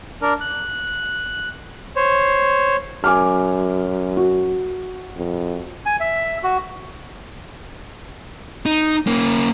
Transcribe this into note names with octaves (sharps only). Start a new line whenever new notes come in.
D4 A#4
F#6
C5 C#5
F#2 G#5 D6 F6
F#4
F2
G#5
E5
F#4
D#4
A#3 C#4